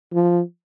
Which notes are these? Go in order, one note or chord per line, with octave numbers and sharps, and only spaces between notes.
F3